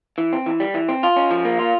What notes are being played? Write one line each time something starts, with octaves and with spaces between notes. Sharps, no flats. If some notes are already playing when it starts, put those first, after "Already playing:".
E3
C4
E3
G3
E3
C4
F4
C#4
F3
A#3
F4